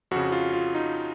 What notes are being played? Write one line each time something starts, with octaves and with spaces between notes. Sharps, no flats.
F2 C#3 F#4
F4
F4
D#4